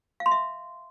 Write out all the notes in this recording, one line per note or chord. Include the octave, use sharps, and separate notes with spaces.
F5
C6
E5